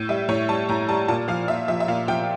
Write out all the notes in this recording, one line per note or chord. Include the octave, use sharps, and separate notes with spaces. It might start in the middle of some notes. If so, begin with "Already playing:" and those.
Already playing: A2
G3 E5
A2 C#5
G3 A5
A2 A#5
G3 A5
A#2 A5
F3 F5
A#2 E5
F3 E5
E5
A#2 F5
F3 G5